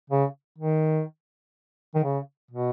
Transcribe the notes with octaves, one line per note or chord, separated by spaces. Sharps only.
C#3
D#3
D#3
C#3
B2